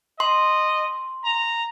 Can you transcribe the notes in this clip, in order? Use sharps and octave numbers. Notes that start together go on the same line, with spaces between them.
D#5 C6
A#5